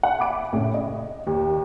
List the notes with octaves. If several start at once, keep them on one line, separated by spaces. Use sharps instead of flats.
F#5
E5 B5 D6 D7
A2 C#3
D#5
D#2